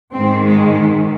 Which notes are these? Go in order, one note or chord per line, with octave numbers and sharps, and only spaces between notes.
G#2 D#3 C4
G#3